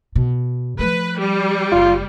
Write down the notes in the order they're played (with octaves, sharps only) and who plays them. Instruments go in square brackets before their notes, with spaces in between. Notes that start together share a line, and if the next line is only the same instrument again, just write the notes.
[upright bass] B2
[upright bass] F3 A3 [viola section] B4
[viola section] G3
[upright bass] F#1 [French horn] F4